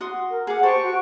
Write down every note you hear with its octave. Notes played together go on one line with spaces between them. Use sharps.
F#4 C6 D#6
A#4
G#4 F#5 D6
G4 A4 C5 G5 C#6
F#4